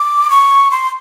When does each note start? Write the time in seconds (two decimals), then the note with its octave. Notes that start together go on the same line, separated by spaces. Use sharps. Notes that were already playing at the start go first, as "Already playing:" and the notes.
Already playing: D6
0.30 C#6
0.71 C6